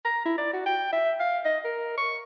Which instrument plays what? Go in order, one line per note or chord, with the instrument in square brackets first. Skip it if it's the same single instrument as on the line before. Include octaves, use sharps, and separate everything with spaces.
[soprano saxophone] A#5
E4
D5
F#4
G5
E5
F5
D#5
A#4
C#6